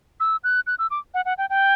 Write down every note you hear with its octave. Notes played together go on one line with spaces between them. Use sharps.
E6
F#6
F#6
E6
D6
F#5
F#5
G5
G5